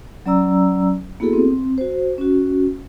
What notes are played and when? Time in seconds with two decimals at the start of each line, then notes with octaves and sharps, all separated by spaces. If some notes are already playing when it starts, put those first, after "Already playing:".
0.26 F#3 C#4 D5 A#5 E6
1.20 A#3 B3 E4 F#4 G#4 A4
1.33 C4
1.78 F#4 C5
2.18 C#4 F#4